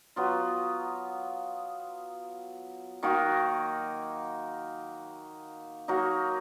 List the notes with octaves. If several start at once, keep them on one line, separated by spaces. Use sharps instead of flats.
F#3 B3 F4
D#3 A#3 D#4 F#4
F#3 A#3 D#4 F#4